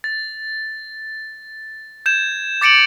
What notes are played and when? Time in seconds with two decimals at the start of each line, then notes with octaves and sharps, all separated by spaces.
0.04 A6
2.06 G6 G#6 E7
2.61 D6 A6 C#7 D7 F#7